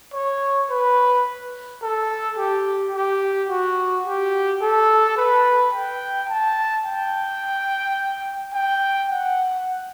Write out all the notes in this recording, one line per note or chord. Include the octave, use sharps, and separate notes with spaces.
C#5
B4
A4
G4
G4
F#4
G4
A4
B4
G5
A5
G5
G5
F#5